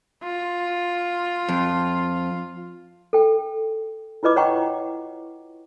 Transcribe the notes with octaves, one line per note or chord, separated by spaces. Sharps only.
F4
F2
A4 G5
E4 F4 B4 D#5 D6
C#5 D#5 F#5 G5 A#5 C#6